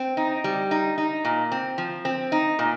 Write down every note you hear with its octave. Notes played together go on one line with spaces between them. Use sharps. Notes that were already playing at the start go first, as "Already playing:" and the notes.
Already playing: C4
D#4
G3
D#4
D#4
A#2
C4
F3
C4
D#4
A#2